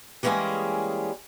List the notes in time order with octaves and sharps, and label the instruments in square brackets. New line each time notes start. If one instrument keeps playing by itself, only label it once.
[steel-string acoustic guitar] E3 G3 G#3 A#3 C#4 G#4